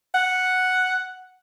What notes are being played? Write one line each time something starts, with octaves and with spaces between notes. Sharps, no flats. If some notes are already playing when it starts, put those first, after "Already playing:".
F#5